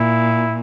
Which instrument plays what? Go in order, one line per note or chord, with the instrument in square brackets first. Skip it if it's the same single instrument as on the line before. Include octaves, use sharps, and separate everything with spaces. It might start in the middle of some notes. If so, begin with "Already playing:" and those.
Already playing: [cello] A#2 [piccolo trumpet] E4